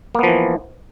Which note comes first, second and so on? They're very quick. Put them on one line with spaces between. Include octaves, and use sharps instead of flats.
A#3 B3 F3 E3